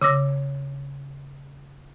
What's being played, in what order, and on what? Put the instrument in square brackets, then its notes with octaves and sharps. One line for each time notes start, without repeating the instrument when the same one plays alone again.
[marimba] C#3 D6 E6 A#6